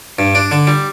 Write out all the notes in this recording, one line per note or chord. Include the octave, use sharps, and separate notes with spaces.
G2
D4
D3
G3